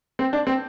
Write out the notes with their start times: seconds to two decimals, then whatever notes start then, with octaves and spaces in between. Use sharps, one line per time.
0.19 C4
0.33 D4
0.47 C4